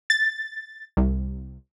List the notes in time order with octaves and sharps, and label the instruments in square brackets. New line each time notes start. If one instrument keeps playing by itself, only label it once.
[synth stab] A6
C2